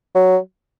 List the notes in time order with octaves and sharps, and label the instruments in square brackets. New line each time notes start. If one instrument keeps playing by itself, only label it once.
[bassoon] F#3